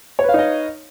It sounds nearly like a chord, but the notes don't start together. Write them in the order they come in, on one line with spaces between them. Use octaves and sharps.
C#5 B4 F5 D#4 D#5